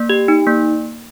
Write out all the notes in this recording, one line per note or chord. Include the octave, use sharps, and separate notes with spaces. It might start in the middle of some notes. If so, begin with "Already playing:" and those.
Already playing: A#3
G4
D#4
A#3